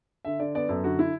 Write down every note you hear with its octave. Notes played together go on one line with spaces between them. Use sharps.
D3 E5
D3 D5
B3 D5
F#2 A4
D3 F#4
E4